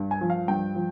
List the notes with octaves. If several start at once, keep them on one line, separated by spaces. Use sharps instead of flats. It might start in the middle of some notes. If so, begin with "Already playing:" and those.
Already playing: G2
G#5
F3
F5
G2 G5
F3